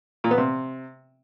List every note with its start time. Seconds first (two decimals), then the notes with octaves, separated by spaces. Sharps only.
0.24 A#2
0.31 B3
0.38 C3